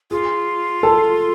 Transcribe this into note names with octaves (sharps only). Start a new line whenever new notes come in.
F4 G#4
A4